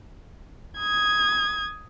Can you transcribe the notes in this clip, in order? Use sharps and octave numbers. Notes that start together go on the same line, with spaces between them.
D#6 G#6